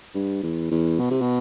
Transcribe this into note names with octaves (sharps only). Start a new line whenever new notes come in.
G2
E2
E2
B2
C3
B2